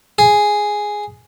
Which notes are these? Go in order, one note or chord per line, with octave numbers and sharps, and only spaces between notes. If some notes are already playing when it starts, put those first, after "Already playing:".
G#4